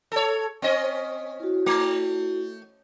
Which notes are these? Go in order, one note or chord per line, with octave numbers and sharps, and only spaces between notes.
A4 C#5
C4 C#4 D#5
E4 F#4
A3